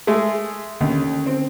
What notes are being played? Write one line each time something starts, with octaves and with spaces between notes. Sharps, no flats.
G#3 A3 G#4
D#2 D3 C#4
C4